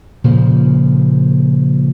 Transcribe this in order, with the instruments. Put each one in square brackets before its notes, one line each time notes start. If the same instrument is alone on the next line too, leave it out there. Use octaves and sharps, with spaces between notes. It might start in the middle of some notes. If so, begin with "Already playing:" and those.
[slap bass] A#2 C#3 F3